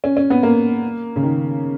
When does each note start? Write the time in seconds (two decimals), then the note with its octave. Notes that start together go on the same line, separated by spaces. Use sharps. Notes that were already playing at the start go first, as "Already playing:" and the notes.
0.04 C#4
0.17 C#4
0.30 B3
0.43 A#3
1.16 C#3
1.23 D#3